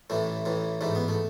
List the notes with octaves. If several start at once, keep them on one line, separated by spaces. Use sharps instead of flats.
A1 A2 E3 A3
A1 A2 E3
A1 G#2 E3 A3
B3
A3